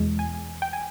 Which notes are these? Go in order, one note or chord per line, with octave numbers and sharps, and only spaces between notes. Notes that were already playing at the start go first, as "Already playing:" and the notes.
Already playing: E2 B2 G#3
G#5
G5
G#5